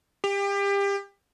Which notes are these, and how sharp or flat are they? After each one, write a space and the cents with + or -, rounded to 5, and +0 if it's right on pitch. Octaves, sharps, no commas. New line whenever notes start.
G4 +30